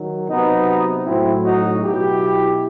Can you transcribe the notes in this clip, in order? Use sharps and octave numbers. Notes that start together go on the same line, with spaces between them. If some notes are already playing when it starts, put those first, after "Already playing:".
Already playing: D#3 F#3
C3 F#3 B3 D#4
A2 F#3 C4 E4
D#4 F#4
B2 F#3 E4 G4